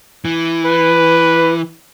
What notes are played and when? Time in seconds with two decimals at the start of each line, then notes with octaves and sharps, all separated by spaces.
0.25 E3
0.65 B4